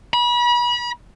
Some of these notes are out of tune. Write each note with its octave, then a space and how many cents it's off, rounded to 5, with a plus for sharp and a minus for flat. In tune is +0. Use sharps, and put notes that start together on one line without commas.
B5 -35